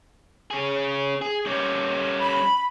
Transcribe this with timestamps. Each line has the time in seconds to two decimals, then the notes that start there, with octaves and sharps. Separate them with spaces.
0.50 C#4 G#4
1.22 G#4
1.46 G3 C#4
2.20 B5